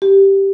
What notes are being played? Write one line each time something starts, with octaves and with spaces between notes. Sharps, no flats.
G4